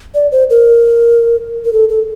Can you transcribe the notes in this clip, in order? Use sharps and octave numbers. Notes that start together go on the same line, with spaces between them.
D5
C5
A#4
A#4
A4
A4